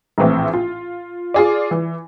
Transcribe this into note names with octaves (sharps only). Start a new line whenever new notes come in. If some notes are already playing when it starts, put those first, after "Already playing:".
A#1 A2 E3 C4 E4
F4
F4 G#4 D5
E3